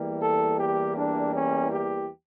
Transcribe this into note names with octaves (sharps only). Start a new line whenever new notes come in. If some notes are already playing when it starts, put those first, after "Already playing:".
Already playing: E2 E3 G3 A#3
A4
G4
D4
C#4
G4